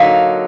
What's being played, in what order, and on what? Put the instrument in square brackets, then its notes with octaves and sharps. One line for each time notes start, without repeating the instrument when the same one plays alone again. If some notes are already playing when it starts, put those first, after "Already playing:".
Already playing: [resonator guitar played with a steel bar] D3 F#3 A#3 D#4 [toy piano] F5